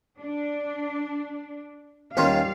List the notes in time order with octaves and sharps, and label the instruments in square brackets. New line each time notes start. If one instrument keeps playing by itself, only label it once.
[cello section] D4
[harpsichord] D#2 C#4 F4 [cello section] G3 F5